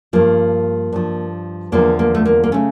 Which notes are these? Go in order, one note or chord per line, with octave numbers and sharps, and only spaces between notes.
G2 F3 A#3
G2 F3
E2 D3 F3 A#3
A#3
A3
A#3
A#3
C#3 A3 C#4